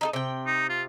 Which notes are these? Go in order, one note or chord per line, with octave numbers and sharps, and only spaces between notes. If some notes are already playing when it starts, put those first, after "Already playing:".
D#4 E4 A4
C3 G5
D#4
F4